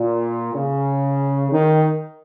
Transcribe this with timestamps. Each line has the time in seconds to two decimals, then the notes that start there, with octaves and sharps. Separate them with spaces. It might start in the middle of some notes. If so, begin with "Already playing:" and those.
Already playing: A#2
0.54 C#3
1.52 D#3